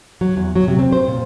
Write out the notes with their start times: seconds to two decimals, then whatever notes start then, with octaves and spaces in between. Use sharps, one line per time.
0.21 F#3
0.37 E2
0.55 F#3
0.68 C3
0.79 C4
0.93 C5
1.08 A#2